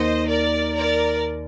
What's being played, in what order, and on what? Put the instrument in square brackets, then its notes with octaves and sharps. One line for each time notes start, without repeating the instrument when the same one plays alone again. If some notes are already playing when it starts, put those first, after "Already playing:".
Already playing: [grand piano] D#2 D#3 A#3 [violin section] C5 D#5
[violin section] A#4 D5
A#4 D5